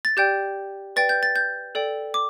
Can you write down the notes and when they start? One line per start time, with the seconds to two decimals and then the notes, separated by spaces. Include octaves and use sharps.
0.05 A6
0.17 G4 D5 G5 G6
0.96 B4 D5 G5 A6
1.09 G6
1.23 A6
1.36 G6
1.75 A4 D5 G5
2.14 D6